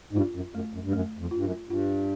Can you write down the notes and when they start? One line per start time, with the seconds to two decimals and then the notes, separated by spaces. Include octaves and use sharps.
0.13 G#2
0.16 G2 F4
0.35 F#2
0.54 F#2 A3
0.73 F#2
0.84 G2
0.93 F#2 A3
1.19 F2
1.31 G2 F4
1.44 F#2
1.69 G2 F4